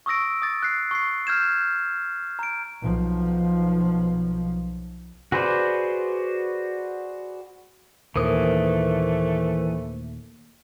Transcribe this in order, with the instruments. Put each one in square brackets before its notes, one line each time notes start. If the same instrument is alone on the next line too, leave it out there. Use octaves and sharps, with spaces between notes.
[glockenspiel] C#6 D#6 E6 A#6 D7
D#6 A6
F#6 C7
C#6 C7
F6 G6 G#6 E7
A#5 D7
[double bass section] B1 F3
[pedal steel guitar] F#4 G#4 B4 C5 D5
[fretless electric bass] D#2 A#2 [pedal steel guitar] E3 D#6 [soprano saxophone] A3 [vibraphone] A#4 C5